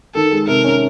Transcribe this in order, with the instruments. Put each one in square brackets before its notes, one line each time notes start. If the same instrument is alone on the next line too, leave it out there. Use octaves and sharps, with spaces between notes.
[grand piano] D#3 [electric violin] A4
[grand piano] G#3
[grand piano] C3 [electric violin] A#4
[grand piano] C#4